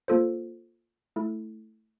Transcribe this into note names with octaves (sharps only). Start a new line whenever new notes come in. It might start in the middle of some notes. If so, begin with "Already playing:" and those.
A#3 F4 A4 C5
A3 E4 A4